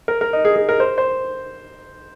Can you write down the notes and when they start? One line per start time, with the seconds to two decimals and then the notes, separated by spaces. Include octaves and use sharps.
0.08 A#4
0.21 A#4
0.33 D#4
0.45 G#4
0.56 G#4
0.69 A#4
0.80 C5
0.98 C5